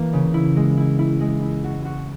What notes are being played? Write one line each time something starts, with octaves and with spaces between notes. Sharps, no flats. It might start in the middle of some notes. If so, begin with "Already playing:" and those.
Already playing: E3 A#3
C#3
E4
G#3
E4
E4
G#3
E4
F#4
F#4